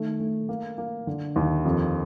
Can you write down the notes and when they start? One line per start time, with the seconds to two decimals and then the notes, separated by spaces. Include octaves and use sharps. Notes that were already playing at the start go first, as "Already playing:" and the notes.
Already playing: D#3 A3
0.20 A3
0.49 A#3
0.78 A#3
1.07 D3
1.36 D#2
1.65 F2